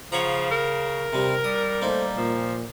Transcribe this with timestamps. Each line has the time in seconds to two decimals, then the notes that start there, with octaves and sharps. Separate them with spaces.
0.12 C#3 F3 C#5 F#5 A#5
0.51 A#4
1.13 C3 G3
1.44 G3 D#6
1.82 A3 A#3 D#4 A4 C5
2.15 A#2 F3